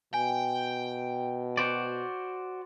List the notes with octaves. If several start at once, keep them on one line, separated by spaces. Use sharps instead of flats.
B2 G5 G#5
F#4 C5 D5